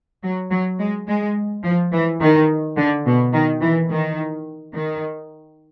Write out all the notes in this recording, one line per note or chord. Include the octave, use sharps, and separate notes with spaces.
F#3
F#3
G#3
G#3
F3
E3
D#3
D3
B2
D#3
E3
D#3
D#3